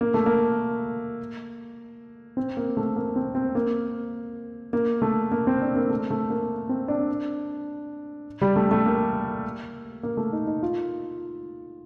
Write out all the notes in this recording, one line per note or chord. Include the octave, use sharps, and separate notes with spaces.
A#3
A3
A#3
C4
A#3
A3
A#3
C4
C4
A#3
A#3
A3
A#3
C4
D4
A#3
A3
A3
A#3
C4
D4
G3
A3
A3
A#3
A#3
A3
D#4
D#4
F4